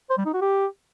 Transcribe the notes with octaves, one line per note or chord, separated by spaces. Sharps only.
C5
G3
D#4
F#4
G4